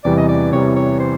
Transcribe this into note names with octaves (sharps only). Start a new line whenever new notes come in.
E2 C3 E3 G3 D5
D#5
D5
E2 C3 E3 G3 C#5
C#5
C5